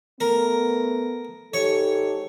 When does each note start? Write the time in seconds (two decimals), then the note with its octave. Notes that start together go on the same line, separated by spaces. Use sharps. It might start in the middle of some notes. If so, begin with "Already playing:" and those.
0.20 A3 B3 A#4
1.54 G#2 G4 A4 C#5